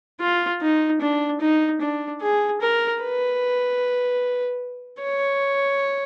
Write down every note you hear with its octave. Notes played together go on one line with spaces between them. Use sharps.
F4
D#4
D4
D#4
D4
G#4
A#4
B4
C#5